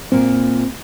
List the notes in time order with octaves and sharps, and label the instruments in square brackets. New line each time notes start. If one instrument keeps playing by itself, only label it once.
[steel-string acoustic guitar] A#2 A#3 [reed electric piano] C4